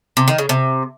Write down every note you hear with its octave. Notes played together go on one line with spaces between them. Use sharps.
C3
D#3
C#3
C3